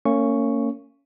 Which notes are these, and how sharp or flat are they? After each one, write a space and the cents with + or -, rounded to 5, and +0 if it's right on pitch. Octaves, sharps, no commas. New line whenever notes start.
A#3 -35 C#4 +0 C#6 +0